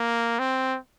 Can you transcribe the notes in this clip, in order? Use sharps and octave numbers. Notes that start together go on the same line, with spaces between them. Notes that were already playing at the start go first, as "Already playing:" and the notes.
Already playing: A#3
C4